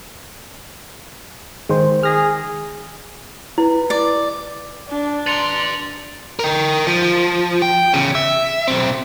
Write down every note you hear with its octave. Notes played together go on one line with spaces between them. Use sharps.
D#3 G#3 C5
G#4 F6 A#6
E4 B4
D5
D4
B4 A#5 C6 A6 C#7 F7
A#4 G5
F3
G5
E2 C#3
E5
B1 C4